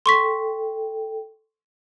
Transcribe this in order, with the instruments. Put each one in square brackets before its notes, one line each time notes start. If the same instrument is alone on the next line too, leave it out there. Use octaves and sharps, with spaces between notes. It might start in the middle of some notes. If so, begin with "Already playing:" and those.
[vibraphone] A4 G5 [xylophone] C6 C#6 B6